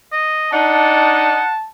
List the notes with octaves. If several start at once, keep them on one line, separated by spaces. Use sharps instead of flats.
D#5
D4 D#4 F#5 A5